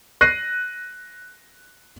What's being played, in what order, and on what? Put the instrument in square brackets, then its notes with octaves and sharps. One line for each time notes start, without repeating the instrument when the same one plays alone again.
[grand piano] F#6 A#6 C7 D#7